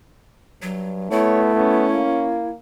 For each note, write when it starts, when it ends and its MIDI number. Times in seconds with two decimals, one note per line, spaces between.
0.62 1.11 43
0.62 1.08 54
1.11 2.09 57
1.11 1.50 59
1.11 2.49 64
1.11 1.41 73
1.55 1.86 59
1.55 2.39 61
1.94 2.55 58